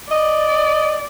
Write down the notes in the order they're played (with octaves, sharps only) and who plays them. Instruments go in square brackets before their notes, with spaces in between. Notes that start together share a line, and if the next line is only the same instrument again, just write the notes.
[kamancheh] D5 [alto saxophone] D#5